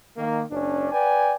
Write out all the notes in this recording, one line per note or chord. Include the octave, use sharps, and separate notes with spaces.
D#3 A#3
F#1 C#4 D4
B4 D5 G5 G#5